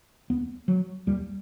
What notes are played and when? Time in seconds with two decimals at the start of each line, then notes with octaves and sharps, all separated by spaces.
0.30 D#2 B3
0.68 F#3
1.07 D#2 G3